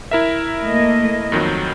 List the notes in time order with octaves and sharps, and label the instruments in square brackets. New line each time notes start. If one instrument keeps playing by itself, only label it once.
[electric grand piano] E4 A#4 E5
[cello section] A3 A#3 D#5
[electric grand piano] F2 D#3 F#3